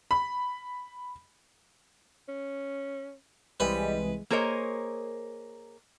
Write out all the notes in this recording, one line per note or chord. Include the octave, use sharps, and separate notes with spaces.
B5
C#4
C2 E3 G3 G#3 B4
A#3 G#4 A#4 C5 C#5 D#5